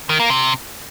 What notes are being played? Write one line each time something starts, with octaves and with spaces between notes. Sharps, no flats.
D#3
A#3
C3